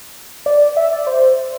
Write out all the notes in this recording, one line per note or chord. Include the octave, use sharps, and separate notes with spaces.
D5
E5
D5
C5